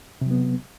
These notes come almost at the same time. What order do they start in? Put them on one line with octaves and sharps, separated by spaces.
C3 F#3 B3